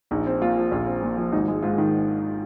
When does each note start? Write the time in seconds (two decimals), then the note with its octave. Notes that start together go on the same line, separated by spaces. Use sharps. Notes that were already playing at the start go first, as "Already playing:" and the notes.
0.11 A#1 D#4
0.27 C4
0.42 A#2 F4
0.57 F3
0.72 A#1 F4
0.87 C4
1.02 A#2
1.17 F3
1.32 G#1 D#4
1.48 G#3
1.62 G#2 F4
1.78 D#3